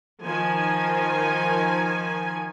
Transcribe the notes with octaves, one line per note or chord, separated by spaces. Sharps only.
D#3 F3 G#5